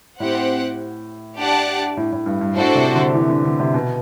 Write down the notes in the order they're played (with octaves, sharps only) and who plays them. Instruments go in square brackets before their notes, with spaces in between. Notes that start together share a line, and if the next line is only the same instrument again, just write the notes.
[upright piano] A2 [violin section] C4 G4 C5 F#5
[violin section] D4 G4 D5 F#5 A5
[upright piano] A2
A2
G2
G2
[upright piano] A2 [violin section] D4 F#4 A4 C5
[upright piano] C3
D3
E3
D3
D3
C3
B2